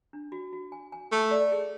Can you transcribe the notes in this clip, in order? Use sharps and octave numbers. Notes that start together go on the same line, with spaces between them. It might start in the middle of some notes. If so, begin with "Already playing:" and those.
D4
F#4
F#4
G#5
G#5
A3 C#6
D5
G#4